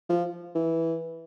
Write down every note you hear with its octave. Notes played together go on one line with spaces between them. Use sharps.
F3
E3